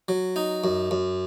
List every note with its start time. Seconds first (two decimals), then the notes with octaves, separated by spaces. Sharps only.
0.08 F#3
0.36 D#4
0.64 F#2
0.91 F#2